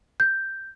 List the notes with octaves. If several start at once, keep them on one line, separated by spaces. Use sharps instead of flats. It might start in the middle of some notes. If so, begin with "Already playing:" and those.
G6